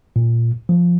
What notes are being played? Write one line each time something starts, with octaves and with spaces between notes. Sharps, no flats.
A#2
F3